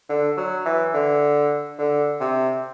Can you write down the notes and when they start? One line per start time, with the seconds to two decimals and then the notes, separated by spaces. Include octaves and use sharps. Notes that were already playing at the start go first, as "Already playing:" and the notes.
0.09 D3
0.37 F#3
0.65 E3
0.94 D3
1.78 D3
2.20 C3